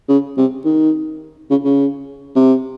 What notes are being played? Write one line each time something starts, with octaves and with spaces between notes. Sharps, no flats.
C#3
C3
D#3
C#3
C#3
C3